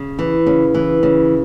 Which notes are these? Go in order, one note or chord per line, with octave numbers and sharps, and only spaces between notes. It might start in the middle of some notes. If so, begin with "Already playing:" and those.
Already playing: C#3
E3
C#3
E3
C#3